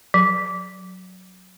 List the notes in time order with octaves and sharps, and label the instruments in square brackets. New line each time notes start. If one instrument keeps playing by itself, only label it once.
[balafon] F#3